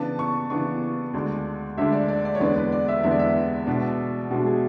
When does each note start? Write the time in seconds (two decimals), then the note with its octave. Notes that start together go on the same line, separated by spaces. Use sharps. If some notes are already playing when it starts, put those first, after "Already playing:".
Already playing: C#3 E3 B3 D4 A5
0.19 C#6
0.50 C#3 E3 B3 D4 C#6
1.14 D2 D3 G#3 D4
1.77 D2 D3 G#3 D4 E5
1.92 D5
2.08 D5
2.25 D5
2.35 C#5
2.40 E2 D3 G#3 B3 D4 D5
2.56 B4
2.72 D5
2.88 E5
3.03 E2 D3 G#3 B3 D4 E5
3.11 D5
3.19 E5
3.67 B2 G#3 D4
4.31 B2 G#3 D4 F#4
4.46 G#4